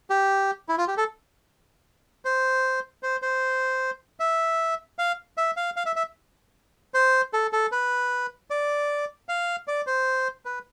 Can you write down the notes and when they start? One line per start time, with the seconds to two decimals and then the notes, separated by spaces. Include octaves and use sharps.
0.10 G4
0.69 E4
0.78 F4
0.88 G4
0.97 A4
2.25 C5
3.03 C5
3.22 C5
4.20 E5
4.99 F5
5.37 E5
5.57 F5
5.76 F5
5.86 E5
5.96 E5
6.94 C5
7.33 A4
7.53 A4
7.72 B4
8.50 D5
9.29 F5
9.68 D5
9.87 C5
10.45 B4